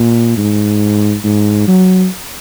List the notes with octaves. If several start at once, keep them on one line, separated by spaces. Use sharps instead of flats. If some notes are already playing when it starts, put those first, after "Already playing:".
Already playing: A#2
G#2
G#2
F#3